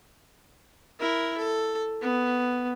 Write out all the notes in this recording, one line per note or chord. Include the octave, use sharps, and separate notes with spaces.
E4 A#4
A4
B3